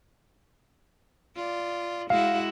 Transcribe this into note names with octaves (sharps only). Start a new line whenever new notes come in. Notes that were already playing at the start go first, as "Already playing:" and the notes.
F4 D5
G#3 E4 F#4 F5